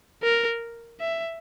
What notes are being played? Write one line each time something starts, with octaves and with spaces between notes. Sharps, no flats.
A#4
E5